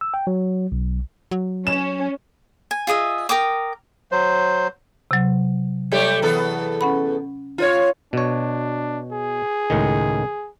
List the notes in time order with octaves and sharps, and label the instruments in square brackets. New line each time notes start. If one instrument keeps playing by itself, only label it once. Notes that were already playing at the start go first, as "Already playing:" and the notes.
[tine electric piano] E6
G5
F#3
B1
[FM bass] F#3
[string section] C#4 [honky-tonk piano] E7
[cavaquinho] G#5
F4 G#4 D#5 E5
A#4 G5 D6 D#6
[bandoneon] F#3 C5
[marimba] C3 F#3
[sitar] G3 A3 G4 [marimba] C#5 E5
[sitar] E2 B3 A4
[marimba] C#4 F#5 B5
[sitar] F4 C5 C#5
[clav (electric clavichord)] B2 C#5 [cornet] D4
[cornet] G#4
[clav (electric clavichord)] C#2 A2 D#3